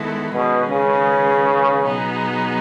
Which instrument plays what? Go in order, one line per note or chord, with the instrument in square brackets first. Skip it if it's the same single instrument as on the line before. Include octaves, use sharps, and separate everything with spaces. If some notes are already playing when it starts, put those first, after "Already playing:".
Already playing: [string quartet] D#3 G#3 B3 E4 A4
[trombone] B2 [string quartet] D#3 G#3 C#4 G#4 B4
[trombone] C#3
[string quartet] B2 F#3 B3 D#4 G#4